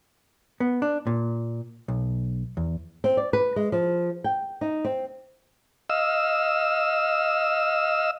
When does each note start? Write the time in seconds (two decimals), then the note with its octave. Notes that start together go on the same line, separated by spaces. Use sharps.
0.60 B3
0.82 D4
1.07 A#2
1.88 B1
2.57 E2
3.04 C4
3.17 D5
3.33 B4
3.56 G#3
3.72 F3
4.24 G5
4.61 D#4
4.85 C4
5.90 D#5 F5 E6